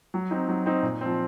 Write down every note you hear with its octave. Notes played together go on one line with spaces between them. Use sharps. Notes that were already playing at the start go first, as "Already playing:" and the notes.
F#3
C4 D#4
F#3
C4 D#4
A#2
F3 C4